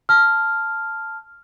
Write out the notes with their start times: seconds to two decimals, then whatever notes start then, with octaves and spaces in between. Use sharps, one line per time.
0.09 A5 F6